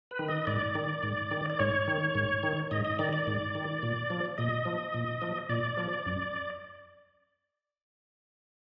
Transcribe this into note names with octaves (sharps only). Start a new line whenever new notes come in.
B4
D#3
D#5
G#2 D5
D#3
G#2
D#3
D5
G#2 C#5
D#3
G#2
D#3
G#2 D#5
D#5
D#3 D5
D5
G#2
D#3
A#2
F3
A#2 D#5
F3
A#2
F3
A#2 D5
F3
F#2